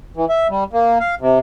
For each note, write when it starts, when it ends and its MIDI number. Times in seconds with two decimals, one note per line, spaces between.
0.17 0.25 52
0.29 0.47 76
0.50 0.64 55
0.73 0.98 58
1.00 1.15 77
1.21 1.39 48